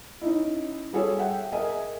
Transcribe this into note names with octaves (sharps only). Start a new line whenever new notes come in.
C#4 D#4 E4
G3 F#4 G#4 A4 C#5
E5 F#5 G5
G#4 A#4 D#5 E5 G#5